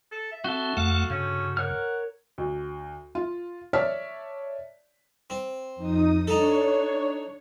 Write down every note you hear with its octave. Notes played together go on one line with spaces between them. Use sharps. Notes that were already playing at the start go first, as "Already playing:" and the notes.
A4
E5
C4 F#4 A4
F2 A3 F5 F#5
G2 C#3 C#4
A#4 C#5 F#5 F6
D2
F4
C#5 D5 E5 A5 F6 B6
C4
F2 D#4 D#6
D4 D#4 A4 C#5